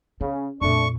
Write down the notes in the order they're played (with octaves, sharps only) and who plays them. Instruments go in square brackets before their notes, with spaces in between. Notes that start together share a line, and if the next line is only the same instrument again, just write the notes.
[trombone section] C#3 [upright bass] C#4
[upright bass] F2 A#2 [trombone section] A3 D4 [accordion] C#6